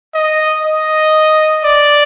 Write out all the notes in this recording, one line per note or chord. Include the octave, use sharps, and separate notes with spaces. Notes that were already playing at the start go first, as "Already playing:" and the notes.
D#5
D#5
D5